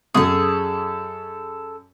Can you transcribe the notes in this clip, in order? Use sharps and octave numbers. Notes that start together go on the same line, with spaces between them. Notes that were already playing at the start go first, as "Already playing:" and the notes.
F#2 F#4 G#4 A4 D#6